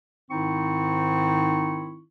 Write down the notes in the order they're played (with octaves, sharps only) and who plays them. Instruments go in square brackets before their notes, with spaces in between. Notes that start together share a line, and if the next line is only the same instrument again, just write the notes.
[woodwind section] G#2 D#3 C4 D#4 E4 C#6